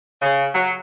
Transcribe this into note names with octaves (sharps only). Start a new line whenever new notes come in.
C#3
F#3